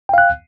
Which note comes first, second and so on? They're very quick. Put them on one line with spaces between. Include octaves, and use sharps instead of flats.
G5 F5 F#6